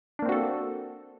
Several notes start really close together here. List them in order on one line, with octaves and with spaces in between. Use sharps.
D4 A#3 C4 F#4 A4